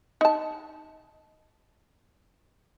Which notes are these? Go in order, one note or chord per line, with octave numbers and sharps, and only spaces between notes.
D#4 A5